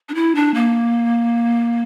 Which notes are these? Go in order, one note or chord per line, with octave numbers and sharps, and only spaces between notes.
D4
E4
D4
A#3